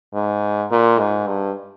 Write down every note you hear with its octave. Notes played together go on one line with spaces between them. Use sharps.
G#2
A#2
G#2
G2